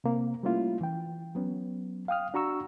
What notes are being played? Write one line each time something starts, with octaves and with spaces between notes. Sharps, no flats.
C3 A#3 C4
G3 A3 A#3 C#4 E4 F4
E3 G5
F#3 B3 C#4
F5 G5 D#6 F6
D4 F#4 A#5 C#6 E6